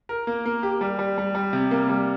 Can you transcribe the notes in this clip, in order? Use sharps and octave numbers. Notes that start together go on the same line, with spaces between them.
A#4
A#3
A#3
G4
G3
G3
G3
G3
C3
A#3
G3